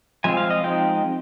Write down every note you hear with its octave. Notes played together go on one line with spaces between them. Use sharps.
F3 G#3 C4 F4 G#5
F5
D#5
F3 G#3 C4 D#4 G5